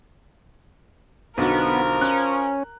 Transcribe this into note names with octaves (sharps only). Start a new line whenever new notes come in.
B1 D3 F3 B3 F#4 A#4
C#4 F#6